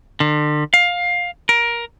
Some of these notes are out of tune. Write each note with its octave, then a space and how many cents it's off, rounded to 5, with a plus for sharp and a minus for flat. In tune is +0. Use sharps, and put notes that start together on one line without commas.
D3 +35
F5 +15
A#4 +15